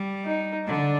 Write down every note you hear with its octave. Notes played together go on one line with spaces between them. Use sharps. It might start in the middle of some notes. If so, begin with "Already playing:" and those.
Already playing: G3
D#4
D3 D4